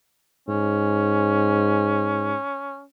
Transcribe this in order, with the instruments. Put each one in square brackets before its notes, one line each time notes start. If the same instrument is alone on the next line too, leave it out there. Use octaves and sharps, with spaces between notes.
[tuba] G#2 [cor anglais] C#4